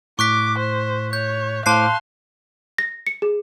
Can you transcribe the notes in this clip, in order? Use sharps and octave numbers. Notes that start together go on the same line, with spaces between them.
A2 C#6 D6 F#6 B6
C5
C#5 G6
A2 C5 F5 A5 C6 D6 F#6 C7
A#6
C#7
G#4